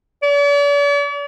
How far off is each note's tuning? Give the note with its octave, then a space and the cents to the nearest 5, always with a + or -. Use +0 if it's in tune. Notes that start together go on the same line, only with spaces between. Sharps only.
D5 -45